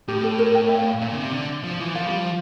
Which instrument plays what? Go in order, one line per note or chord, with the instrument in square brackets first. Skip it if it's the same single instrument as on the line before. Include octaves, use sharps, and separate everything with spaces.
[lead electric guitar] A2 [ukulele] G4
[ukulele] A4
A#4
G5
E5
F5
[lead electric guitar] A#2 [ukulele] E5
[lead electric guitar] D3
C3
D3
F3
E3
[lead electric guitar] F3 [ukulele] F5
[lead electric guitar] G3
F3